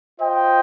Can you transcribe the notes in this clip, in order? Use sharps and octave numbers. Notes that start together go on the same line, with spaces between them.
F4 C5 D#5 G5